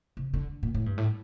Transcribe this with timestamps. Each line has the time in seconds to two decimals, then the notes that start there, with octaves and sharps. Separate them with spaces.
0.17 C3
0.34 D3
0.63 A#2
0.74 A2
0.86 G2
0.98 A2